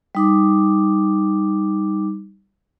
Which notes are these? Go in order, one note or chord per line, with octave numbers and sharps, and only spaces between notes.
G3 D#4 D6